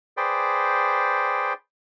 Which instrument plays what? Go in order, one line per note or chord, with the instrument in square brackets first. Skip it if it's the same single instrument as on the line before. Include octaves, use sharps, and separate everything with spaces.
[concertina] G#4 B4 C5 D5 G5